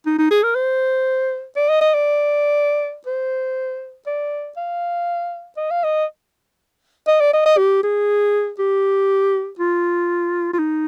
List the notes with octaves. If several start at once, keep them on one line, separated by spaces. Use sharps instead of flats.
D#4
D#4
G#4
A#4
C5
D5
D#5
D#5
D5
C5
D5
F5
D#5
F5
D#5
D#5
D5
D#5
D#5
G4
G#4
G4
F4
F4
D#4